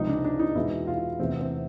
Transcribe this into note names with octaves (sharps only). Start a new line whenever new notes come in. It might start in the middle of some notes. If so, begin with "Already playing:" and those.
Already playing: C#2 C3 F3 G#3 D#4
D4
D4
D#4
E2 B2 G#3 E4
F4
E2 C3 E3 A3 C4
C4